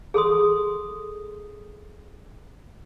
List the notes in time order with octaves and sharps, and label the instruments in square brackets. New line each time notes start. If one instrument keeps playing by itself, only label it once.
[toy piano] G#4 A4 C6 D#6